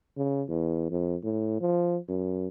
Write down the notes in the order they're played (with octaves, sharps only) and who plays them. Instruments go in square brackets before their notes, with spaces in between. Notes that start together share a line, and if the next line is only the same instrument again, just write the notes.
[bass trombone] C#3
E2
F2
A2
F3
F#2